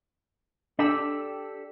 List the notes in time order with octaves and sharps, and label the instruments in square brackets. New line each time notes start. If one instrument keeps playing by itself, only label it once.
[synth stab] D4 E6 [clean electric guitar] G4 A4 D5